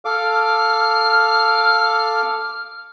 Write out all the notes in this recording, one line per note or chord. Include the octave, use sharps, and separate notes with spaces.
A4 F5 D6 F6